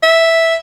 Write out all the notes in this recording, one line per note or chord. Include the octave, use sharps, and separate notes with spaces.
E5